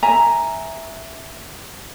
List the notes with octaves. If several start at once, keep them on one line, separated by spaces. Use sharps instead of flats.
E5 G#5 A#5